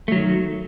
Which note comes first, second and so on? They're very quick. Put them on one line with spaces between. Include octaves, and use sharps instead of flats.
A3 F#3 D#3